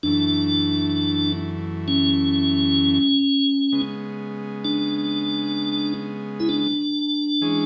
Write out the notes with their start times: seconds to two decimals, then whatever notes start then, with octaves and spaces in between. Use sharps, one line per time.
0.03 F#2 E3 A3 D4
1.88 C#4
3.72 C#3 G#3 B3
4.65 D4
6.40 E4
6.49 D4
7.41 E3 G#3 C#4 G#4